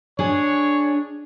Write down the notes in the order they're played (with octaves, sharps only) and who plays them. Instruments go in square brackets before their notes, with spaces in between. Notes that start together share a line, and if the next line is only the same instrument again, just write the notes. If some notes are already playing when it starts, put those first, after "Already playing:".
[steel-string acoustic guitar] D4 G#4 [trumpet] C#5